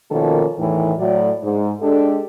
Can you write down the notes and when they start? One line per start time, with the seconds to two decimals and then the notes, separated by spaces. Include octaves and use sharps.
0.11 B2 D#3 F3 A#3 C#4 A4
0.58 E2 A2 D#3 E3
0.98 A2 F#3 D5
1.43 G#2
1.81 G#3 D4 G4 A4